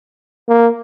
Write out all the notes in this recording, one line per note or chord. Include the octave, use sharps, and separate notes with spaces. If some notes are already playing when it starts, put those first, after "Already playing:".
A#3